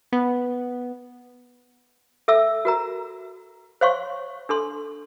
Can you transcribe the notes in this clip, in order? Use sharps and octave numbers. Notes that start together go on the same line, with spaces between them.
B3
A4 E5 E6
F#4 A#4 A#5
C5 C#5 F5 C6 C#6
D4 A4 C6